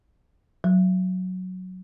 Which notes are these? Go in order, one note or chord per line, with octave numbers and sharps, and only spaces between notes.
F#3